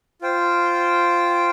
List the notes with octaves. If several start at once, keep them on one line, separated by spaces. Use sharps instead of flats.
F4 C5 G5